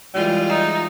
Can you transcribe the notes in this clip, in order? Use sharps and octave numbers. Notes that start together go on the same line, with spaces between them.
E3 G3 G#3 F4
D#4